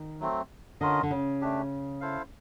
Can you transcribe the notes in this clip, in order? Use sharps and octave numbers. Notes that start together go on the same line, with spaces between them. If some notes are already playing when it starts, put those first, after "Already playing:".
Already playing: D#3
F#3 A3 C4
D3 C#4 F4 A#4 D#5
D3
C#3
A3 D4 G4
E4 A4 C5 F5